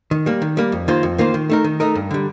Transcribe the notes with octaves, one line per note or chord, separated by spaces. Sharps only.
D#3
G3 A#3
D#3
G3 A#3
F2
D#3 A#3 F4 C5
F2
D#3 A#3 F4 C5
D#3
A3 D#4 A#4
D#3
A3 D#4 A#4
G2
D3 G3